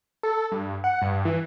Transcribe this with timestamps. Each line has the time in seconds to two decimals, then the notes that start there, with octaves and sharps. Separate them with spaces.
0.23 A4
0.52 G2
0.84 F#5
1.02 G2
1.25 E3